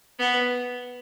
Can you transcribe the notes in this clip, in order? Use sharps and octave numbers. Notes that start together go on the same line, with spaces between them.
B3